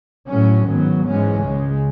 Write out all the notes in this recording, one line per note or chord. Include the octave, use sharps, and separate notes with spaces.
A2 F#3 C#4
G#2 D#3 F#3 B3
G#2 E3 G#3 C#4
C#2 C#3 G#3